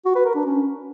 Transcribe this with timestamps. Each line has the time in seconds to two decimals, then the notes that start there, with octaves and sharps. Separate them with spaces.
0.05 F#4
0.15 B4
0.25 A#4
0.35 D4
0.45 C#4